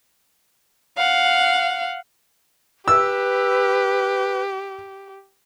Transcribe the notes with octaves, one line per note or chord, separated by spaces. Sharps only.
F5 F#5
G4 B4 E6